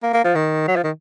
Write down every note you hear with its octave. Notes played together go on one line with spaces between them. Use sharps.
A#3
A#3
F3
D#3
F#3
F3
D#3